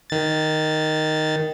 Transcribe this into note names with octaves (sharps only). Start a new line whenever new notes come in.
D#3 A6